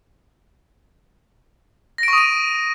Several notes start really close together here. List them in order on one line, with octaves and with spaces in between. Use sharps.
A#6 D7 C#6 D#6 D#7